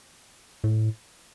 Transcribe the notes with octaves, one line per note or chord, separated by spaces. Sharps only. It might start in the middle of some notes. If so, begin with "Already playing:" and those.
A2